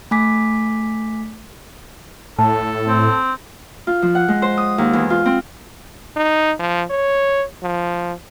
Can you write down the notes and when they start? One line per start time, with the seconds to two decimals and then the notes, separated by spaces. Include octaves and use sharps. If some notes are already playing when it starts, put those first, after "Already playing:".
0.11 A3 G#5 D6 B6
2.39 A2 A4 A5
2.87 C4
3.87 F4
4.02 F3
4.15 F#5
4.28 G#3
4.42 C5
4.58 D#6
4.78 D#2
4.93 E2
5.10 F4
5.26 C4
6.16 D#4
6.59 F3
6.90 C#5
7.63 F3